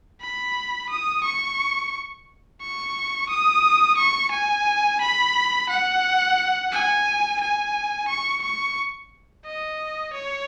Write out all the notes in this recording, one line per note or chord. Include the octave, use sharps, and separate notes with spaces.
B5
D#6
C#6
C#6
D#6
C#6
G#5
B5
F#5
G#5
G#5
C#6
C#6
D#5
C#5